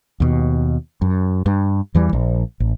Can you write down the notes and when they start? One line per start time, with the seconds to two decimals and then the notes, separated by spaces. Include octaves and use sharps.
0.20 D#2 B2
1.02 F#2
1.46 G2
1.95 E2 E3 G3
2.13 A#1
2.60 A1